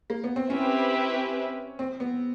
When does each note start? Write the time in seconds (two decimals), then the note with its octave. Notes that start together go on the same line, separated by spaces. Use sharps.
0.10 A#3
0.24 B3
0.36 C4
0.50 C4 C#4 E4 G4 B4 E5
1.79 C4
2.00 B3